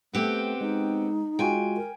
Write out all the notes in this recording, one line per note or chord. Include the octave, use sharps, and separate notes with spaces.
A3 B3 C4 G4
G#3 D#4
G#3 F4 F#4 G5 G#5
A#4